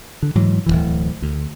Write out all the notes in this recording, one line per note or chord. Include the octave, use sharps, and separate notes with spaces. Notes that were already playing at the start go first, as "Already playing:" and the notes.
D3
G#2 E3 F#3
D1 C#2 E3
D2